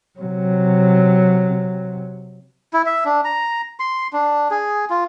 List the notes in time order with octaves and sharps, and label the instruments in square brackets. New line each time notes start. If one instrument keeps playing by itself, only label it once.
[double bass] C3 F#3
[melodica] E4
E5
D4
A#5
C6
D4
G#4
F4